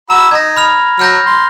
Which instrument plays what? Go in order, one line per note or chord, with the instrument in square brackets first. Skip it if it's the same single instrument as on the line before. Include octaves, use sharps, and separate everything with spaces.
[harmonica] F#4 B5 E6 [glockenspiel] A#5
[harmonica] D#4 [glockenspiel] G#6 A#6
[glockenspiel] B5 F6 F7
[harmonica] F#3 [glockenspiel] F6 G6 A#6
[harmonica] C6